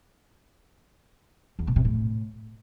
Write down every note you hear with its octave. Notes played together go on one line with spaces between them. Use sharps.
E2
B2
C3
A2